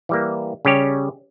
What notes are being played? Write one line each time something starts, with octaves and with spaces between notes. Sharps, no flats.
E3 G3 A#3
C#3 G3 C#4 G4 C#5